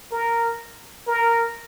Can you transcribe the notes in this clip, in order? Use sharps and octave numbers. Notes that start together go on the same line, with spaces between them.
A#4
A#4